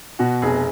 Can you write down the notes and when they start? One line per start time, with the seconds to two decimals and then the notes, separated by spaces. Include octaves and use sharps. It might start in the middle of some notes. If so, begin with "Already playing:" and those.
0.19 B2 F#4
0.42 F1 G#4